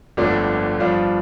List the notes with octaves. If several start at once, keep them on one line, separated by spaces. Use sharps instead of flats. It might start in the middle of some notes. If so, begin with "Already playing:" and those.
G1 F2 D3 A3 D4
G2 F3 D4 F4